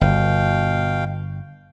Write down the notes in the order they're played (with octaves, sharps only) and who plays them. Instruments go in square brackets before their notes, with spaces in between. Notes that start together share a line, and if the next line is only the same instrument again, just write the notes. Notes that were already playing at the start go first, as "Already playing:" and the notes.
[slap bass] G1 [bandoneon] B2 F5 G5